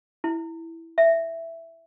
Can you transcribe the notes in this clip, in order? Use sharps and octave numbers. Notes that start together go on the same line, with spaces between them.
E4
E5